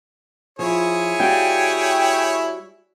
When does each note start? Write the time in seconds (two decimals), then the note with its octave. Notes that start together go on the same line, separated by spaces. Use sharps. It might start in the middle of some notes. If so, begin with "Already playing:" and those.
0.59 F3 E4 G#4 C#5
1.20 G3 F#4 F5 G5